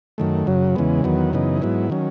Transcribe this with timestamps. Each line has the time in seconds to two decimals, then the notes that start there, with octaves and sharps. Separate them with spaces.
0.18 F#2 D#3 A3
0.47 F#2 C#3 F#3
0.76 E2 C#3 E3 G#3 B3
1.04 E2 D#3 F#3 B3
1.33 F#2 C#3 E3 B3 D#4
1.62 G#2 F#3 B3 E4
1.90 D#3 F#3 C#4